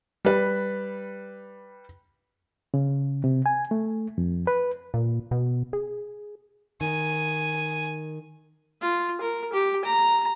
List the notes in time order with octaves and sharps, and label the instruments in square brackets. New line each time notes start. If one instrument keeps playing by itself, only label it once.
[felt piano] G3 B4
[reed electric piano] C#3
C3
G#5
A3
F2
B4
[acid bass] A#2
B2
G#4
[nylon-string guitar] D#3 [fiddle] G#5
[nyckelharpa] F4
A#4
G4
A#5